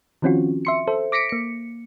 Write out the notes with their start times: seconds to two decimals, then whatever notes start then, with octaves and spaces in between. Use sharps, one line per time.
0.22 D#3 F3 C4 C#4 F4 F#4
0.65 E5 C6 C#7
0.88 A4 C5 E5
1.12 D6 A#6 B6 C#7 D7
1.29 A#3 C#7